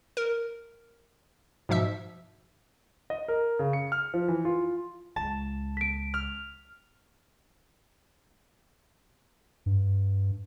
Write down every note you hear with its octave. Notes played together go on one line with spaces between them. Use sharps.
A#4
G#2 B2 F3 E5 E6
D#5
A#4
C#3
C#7
F6
F3
E3
F4
C#2 A5
B6 D7
F6
G2